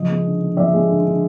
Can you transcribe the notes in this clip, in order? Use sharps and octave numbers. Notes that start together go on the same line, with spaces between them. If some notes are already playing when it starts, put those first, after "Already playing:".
Already playing: C#3 F3 D#5
G#3
D3
D3
F3 D5 E5
G#3
D3
D3